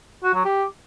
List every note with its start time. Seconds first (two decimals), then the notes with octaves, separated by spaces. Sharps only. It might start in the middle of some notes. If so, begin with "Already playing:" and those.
0.24 F#4
0.34 F#3
0.45 G4